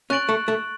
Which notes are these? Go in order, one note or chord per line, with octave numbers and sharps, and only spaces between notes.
C#4 C#6 F#6 A6 D7 F#7
A3
A3